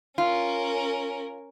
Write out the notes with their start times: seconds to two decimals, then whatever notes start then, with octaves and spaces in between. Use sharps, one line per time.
0.18 C#4 F4 A#4